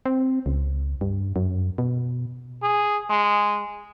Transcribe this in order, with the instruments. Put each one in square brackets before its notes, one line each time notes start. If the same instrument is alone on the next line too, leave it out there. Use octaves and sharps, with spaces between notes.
[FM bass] C4
C#2
G2
F#2
B2
[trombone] G#4
G#3